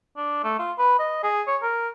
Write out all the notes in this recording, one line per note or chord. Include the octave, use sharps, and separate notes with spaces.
D4
A3
F4
B4
D#5
G#4
C#5
A#4